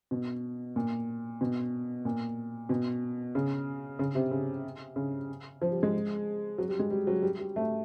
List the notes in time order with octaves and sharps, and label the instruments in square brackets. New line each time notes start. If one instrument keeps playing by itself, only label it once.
[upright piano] B2
A#2
B2
A#2
B2
C#3
C#3
C3
C#3
C#3
F3
G3
G#3
F#3
G3
G#3
G3
F#3
G3
G3
A3